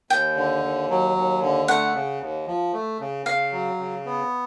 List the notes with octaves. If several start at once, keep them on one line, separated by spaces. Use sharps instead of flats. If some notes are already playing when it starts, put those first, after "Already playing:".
D#2 G5
D3
D#2
F#3
D#2
D3
A3 F#5
C#3
D#2
F3
A3
C#3
C#3 F5
F#3
C#3
B3